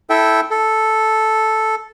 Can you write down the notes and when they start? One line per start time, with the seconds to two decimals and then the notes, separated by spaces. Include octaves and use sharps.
0.10 E4 A4 E5 G5
0.51 A4